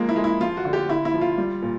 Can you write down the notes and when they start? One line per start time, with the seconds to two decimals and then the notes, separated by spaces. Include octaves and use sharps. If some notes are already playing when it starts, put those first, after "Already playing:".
Already playing: F3 G#3 A#3
0.09 E4
0.16 G#3
0.24 E4
0.40 F3 F4
0.57 F#4
0.65 D3
0.73 G4
0.89 D3 E4
1.05 E4
1.14 F3
1.21 F4
1.38 G3
1.62 A#2